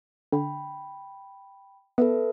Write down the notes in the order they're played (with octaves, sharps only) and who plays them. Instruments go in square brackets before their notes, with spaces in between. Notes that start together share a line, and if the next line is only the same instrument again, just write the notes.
[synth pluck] D3 [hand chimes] G5 B5
[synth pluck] B3 [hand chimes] A4 B4 E5